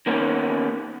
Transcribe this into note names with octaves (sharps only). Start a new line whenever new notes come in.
D#3 A#3 B3 C#4